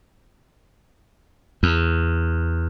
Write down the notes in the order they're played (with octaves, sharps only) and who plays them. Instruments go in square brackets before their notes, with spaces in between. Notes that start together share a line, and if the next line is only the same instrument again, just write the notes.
[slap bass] E2